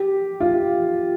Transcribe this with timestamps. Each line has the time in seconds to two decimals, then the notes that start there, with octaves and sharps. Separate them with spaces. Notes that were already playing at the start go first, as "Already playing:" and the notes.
Already playing: G4
0.40 F4